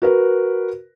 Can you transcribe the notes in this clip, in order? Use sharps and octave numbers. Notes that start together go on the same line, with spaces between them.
F#4 A#4 B4